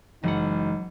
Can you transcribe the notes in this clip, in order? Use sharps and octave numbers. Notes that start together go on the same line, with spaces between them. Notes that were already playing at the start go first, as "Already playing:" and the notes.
F#1 E3 F#3 G#3 D#4 F#5